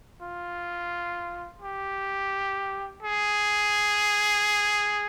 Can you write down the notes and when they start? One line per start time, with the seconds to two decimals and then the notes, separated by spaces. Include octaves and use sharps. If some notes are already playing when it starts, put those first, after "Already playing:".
0.22 F4
1.62 G4
3.03 G#4